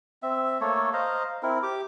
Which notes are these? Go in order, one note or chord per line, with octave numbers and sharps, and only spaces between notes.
C4 E5
A3 A#3 A4 C#5
C5 D#5 F5 A#5
C4 E4 A#4
G4 D6